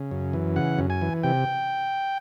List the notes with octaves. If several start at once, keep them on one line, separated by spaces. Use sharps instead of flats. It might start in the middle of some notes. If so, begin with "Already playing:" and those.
Already playing: C#3
F#2
E3
C#3 F#5
F#2
G#5
E3
C3 G5